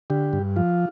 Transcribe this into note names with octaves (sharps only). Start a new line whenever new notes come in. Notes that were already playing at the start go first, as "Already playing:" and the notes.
D3 G4
G2
F3 F4